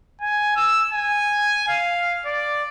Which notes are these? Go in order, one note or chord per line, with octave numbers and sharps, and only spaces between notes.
G#5
E6
G#5
F5
D5